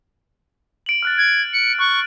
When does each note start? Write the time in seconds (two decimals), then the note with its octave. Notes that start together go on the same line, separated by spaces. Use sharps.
0.86 D7 F#7
1.03 F6 F#6 A6
1.18 G#6
1.53 C#7
1.79 C#6 F#6